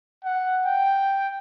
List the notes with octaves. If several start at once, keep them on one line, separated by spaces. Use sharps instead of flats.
F#5
G5